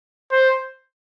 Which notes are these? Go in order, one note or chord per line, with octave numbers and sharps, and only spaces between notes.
C5